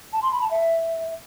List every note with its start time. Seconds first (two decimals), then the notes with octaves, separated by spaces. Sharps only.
0.13 A5
0.23 C6
0.32 B5
0.42 A5
0.51 E5